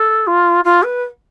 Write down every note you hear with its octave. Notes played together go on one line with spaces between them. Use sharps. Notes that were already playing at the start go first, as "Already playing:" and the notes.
Already playing: A4
F4
F4
B4